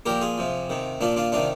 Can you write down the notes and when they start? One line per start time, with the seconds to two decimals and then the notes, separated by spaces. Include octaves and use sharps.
0.06 A#2 F3 G4 A#4
0.21 F4 G#4
0.38 C3 F3
0.70 C3 D#3
1.01 A#2 F3 D4 F4
1.16 D4 F4
1.32 C3 D#3 D4 F4